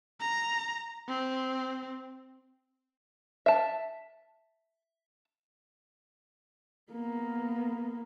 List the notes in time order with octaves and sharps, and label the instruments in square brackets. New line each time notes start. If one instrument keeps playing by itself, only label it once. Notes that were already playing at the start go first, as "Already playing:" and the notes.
[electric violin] A#5
C4
[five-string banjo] E5 A5
[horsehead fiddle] A#3 B3